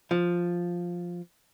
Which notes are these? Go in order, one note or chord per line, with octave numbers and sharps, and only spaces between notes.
F3